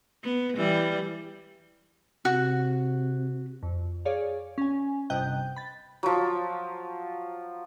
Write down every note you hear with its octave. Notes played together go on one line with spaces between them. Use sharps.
B3
E3 G3
C3 F#4
F2
G#4 C#5 D5 F5
C#4 G#5
G1 C3 D#5 G5 F#6 G6
B5 A6
F3 F#3